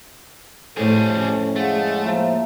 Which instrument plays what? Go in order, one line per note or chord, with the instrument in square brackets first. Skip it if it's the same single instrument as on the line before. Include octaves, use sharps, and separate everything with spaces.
[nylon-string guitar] F2 A2 C5 [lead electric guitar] G3 G#4 [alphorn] A4
[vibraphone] C#4
[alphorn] G#3 [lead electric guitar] A3 [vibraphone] F5 F#5
[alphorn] F3 [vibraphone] A#3 E5 F5